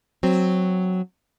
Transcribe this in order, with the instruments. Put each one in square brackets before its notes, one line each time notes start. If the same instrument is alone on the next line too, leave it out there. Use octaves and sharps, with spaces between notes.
[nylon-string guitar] F#3 C4